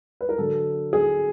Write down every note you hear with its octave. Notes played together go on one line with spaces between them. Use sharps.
B4
A#4
D3 F#3 A4
G#4